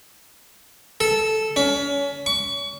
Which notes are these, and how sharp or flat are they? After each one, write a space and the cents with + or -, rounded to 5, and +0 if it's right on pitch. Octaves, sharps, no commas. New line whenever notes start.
A4 -10
C#4 +30
C#6 +35